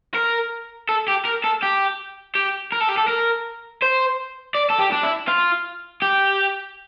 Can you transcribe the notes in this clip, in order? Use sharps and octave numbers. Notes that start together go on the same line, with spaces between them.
A#4
A4
G4
A#4
A4
G4
G4
A#4
A4
G4
A4
A#4
C5
D5
A4
G4
D4
E4
F4
G4